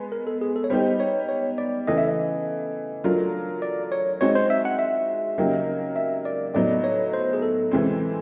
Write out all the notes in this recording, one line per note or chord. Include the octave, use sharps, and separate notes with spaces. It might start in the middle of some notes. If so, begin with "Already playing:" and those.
Already playing: G#3 B3
A#4
A4
G#4
A4
C#5
G3 B3 D#4 G4 C5
C#5
C#5
D5
C#3 E3 A3 D#5
E5
D#5
F#3 A3 D4 F4 A#4
D5
C#5
G#3 C4 D#4 F#4 C#5
C5
E5
F#5
E5
C#3 F#3 A#3 D#4 G4
E5
D5
A2 F#3 B3 D#4 D5
C#5
C5
G#4
A4
C3 E3 G#3 C4